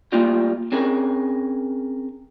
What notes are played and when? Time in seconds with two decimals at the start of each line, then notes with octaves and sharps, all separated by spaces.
0.12 G3 A3 A#3 F4
0.72 C4 C#4 G#4 A#4